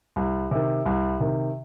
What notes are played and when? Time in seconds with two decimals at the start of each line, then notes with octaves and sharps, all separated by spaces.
0.16 C2
0.51 C3 D#3
0.86 C2
1.20 C3 D#3